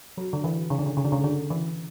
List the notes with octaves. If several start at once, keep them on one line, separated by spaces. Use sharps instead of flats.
F#3
D3
E3
C#3
D3
C#3
C#3
D3
C#3
D3
E3